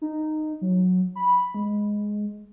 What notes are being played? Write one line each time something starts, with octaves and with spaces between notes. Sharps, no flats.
D#4
F#3
B5
G#3